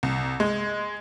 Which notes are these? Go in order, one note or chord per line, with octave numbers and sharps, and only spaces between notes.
C2
G#3